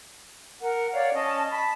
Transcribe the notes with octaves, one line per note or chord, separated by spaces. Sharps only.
A#4 F#5
C#5 D5 F5
C#4 D#5 A5
A5 B5